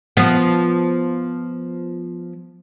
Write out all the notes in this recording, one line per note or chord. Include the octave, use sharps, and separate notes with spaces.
F3 B3